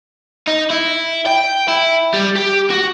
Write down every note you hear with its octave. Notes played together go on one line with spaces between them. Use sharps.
D#4
E4
G5
E4
G3
G4
F#4